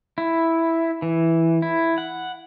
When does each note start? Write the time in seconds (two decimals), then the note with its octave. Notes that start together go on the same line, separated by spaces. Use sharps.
0.18 E4
1.02 E3
1.62 E4
1.98 F#5